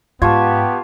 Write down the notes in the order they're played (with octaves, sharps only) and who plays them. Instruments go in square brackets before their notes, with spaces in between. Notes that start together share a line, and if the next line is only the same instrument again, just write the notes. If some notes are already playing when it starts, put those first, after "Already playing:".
[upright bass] G#2 [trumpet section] B3 G4 [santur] F4 [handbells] A5 C#6 G#6